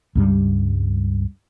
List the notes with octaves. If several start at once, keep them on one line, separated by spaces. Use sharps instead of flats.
C#2 G2 G3